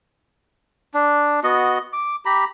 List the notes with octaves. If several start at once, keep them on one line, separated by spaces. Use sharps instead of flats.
D4
B3 F#4 D#5
D6
G4 A#5 B5